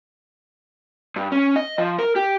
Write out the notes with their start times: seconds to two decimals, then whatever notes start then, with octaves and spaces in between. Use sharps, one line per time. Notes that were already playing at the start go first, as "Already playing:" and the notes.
1.16 G2
1.32 C#4
1.56 D#5
1.78 F3
1.98 A#4
2.16 G4